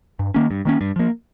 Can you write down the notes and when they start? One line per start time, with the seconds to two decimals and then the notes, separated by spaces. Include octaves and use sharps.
0.19 G2
0.34 D#3 A#3 C#4
0.51 G2
0.65 D#3 A#3 C#4
0.81 G2
0.96 F3 A#3